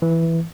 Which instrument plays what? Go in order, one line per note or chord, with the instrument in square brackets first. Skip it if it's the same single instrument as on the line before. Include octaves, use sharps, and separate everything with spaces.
[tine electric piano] E3